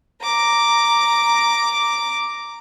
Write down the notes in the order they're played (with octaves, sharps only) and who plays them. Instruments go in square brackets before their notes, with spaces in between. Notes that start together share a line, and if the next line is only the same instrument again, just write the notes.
[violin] A#5 D6